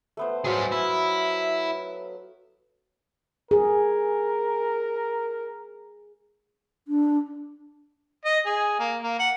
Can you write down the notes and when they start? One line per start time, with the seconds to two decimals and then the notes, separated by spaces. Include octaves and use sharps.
0.17 A3 B3 C5
0.45 F#3 G#4 C5 F5
0.72 E4
3.51 G#4 A#4
6.88 D4
8.25 D#5
8.46 G#4
8.79 A#3
9.02 A#3
9.19 F#5